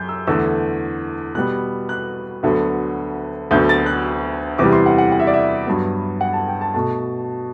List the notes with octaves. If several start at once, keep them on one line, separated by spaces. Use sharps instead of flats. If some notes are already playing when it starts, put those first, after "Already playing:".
Already playing: F#2 G6
E6
E2 D3 A3 E6
B2 G3 B3 F#6
F#6
D2 D3 F#3 B3
D2 D3 F#3 B3 G6
A6
F#6
E2 C3 E3 G3 D6
C6
F#5
F#5
F#5
E5
D5
E5
G2 F#3 B3
F#5
A5
G5
A5
B2 A3 A5